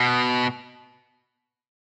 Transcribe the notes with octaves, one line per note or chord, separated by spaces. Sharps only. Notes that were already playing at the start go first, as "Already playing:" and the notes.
Already playing: B2